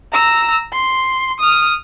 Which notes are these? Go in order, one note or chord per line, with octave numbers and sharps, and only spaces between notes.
A#5 E6
C6
D#6 F6